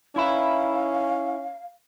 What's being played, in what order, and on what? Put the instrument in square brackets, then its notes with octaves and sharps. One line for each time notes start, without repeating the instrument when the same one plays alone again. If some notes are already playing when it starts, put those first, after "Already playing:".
[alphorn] C#4 [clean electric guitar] D#4 B4 [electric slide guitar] E4 E5 [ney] F5